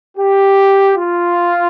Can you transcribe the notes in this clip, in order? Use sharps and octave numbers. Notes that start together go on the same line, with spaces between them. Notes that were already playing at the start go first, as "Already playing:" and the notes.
G4
F4